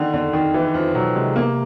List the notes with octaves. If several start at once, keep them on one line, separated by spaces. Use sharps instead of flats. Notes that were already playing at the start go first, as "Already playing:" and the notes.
Already playing: D3 D#3
F2 D3
F2 D#3
E3
F2 F3
B2 F#3
C3 G#3
A#3